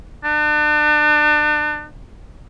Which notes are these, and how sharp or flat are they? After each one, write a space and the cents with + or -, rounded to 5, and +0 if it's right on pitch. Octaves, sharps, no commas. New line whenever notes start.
D4 +35